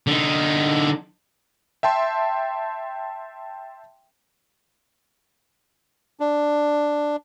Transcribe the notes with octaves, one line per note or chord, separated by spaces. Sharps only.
D3 D#4
E5 G5 A5 C6
D4